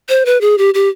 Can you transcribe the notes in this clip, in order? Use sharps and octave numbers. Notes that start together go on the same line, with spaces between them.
C5
B4
G#4
G4
G4